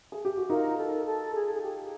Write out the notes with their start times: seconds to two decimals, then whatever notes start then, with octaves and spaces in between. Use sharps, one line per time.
0.12 G#4
0.25 G4
0.37 F#4
0.50 D#4 F4 A#4
0.78 A4
1.06 A4
1.35 G#4
1.55 G#4
1.62 G4